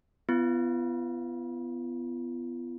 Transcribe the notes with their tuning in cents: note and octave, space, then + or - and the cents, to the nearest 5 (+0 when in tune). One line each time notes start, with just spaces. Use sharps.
B3 +20 F4 -40